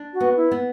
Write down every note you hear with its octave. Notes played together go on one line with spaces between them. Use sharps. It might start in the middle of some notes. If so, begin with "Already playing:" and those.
Already playing: D4
F#4
B3
E4
B3